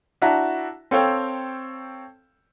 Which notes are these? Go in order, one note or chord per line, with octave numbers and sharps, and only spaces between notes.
D4 E4 F#4 E5 A5 A#5
C4 A4 C#5 F5 G5